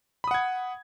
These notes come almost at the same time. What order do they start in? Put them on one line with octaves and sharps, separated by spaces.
B5 D#6 F#5 G#6